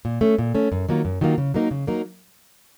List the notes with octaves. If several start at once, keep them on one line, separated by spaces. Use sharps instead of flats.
A#2
A3 C#4
A#2
A3 C#4
F#2
D#3 F#3 A#3 F4
F#2
D#3 F#3 A#3 F4
C#3
F#3 A#3 D#4 A#4
C#3
F#3 A#3 D#4 A#4